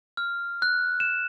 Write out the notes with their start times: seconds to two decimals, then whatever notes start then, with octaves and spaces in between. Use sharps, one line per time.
0.17 F6
0.62 F#6
1.00 E7